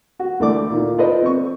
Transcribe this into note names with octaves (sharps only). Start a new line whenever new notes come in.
F#4
D2 E3 A3 A4 D5 D6
A#2 D#3
F4 A4 B4 C5 D5 D#5
C4 C#6